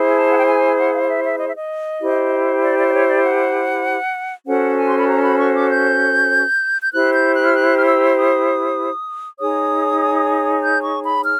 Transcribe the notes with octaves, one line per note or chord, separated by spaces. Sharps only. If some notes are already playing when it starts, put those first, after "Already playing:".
Already playing: E4 G#4 C5
A5
F#5
G5
G#5
F#5
F5
F5
E5
E5
D#5
E5
D#5
E4 G4 C5
D5
D5
D5
C#5
D5
F#5
C#4 F#4 A4 C5 F#5
G#5
C6
B5
A#5
B5
C#6
D6
G6
G6
E4 G4 C5 F#6
G6
F#6
F6
F#6
F6
E6
D#6
D#4 G#4 C#5 D#6
G6
C#6
B5
F6